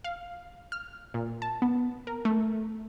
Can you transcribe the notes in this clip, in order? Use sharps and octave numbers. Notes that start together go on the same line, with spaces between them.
F5
F6
A#2
A5
B3
A#4
A3